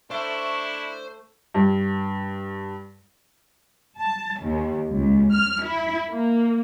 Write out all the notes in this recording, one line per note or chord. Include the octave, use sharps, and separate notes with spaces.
A3 D4 E4 C5
G2
A5
D#2
C#2
F6
E4
A#3